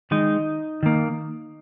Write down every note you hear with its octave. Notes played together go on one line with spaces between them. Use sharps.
D#3 G#3 D#4
D#3 A#3